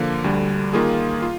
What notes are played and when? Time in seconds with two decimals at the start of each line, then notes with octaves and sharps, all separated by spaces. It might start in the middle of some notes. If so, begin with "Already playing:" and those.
Already playing: D3 F3 A#3
0.24 D2 D3 G3
0.73 D#3 A#3 F4 G#4
1.22 F4